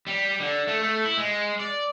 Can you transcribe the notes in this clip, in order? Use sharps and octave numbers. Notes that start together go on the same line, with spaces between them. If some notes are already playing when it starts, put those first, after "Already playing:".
G3
D3
A3
A3
E4
G#3
D5